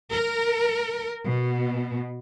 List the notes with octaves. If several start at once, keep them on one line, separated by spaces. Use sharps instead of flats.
A#4
B2